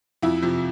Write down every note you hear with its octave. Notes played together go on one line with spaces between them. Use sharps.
F2 E4
C3 F3